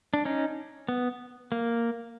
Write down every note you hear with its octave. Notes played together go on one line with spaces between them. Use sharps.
D4
C#4 D#4
B3
A#3